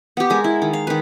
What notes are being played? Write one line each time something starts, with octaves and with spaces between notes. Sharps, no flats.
B3 G4
G#3 A#4
E4
D#3
F5
D#3 B4